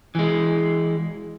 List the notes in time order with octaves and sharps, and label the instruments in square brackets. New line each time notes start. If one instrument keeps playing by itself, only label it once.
[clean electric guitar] E3 G#3